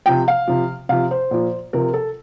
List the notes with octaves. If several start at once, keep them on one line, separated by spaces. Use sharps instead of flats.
C3 F3 G5
F5
C3 F3
C3 F3 F5
C5
A#2 F3
C3 F3 A#4
A4